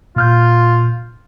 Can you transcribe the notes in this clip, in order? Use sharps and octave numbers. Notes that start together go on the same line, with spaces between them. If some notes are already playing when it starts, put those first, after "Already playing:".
A#2 F4 F6 G6